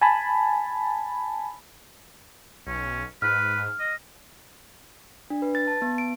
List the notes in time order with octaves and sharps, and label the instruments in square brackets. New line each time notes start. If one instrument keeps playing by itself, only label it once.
[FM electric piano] G#5 A5 B5
[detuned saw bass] B1 [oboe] C#4
[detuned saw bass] G#2 [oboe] B4 [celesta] F6
[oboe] D#5
[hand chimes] D4
B4
A6
A5
B3
D7